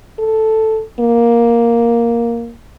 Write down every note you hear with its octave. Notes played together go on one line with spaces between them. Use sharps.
A4
A#3